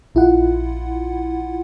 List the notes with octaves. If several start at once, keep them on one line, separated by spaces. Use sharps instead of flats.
A#1 E4 F4 F#5